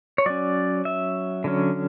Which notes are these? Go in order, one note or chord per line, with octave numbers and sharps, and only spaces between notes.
C#5
F#3 C#4 D5
E5
D3 F#3 C#4